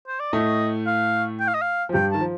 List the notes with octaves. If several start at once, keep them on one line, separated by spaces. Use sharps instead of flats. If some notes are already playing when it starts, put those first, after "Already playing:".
C5
D5
A2 A3 D#5
F5
G5
F5
D#5
F5
F3
G2 G3 G5
D#3 A5
F3